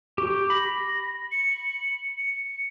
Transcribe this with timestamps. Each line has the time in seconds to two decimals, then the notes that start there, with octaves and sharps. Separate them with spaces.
0.18 G4 C#6
0.50 B5 A#6
1.32 C#7
2.17 C#7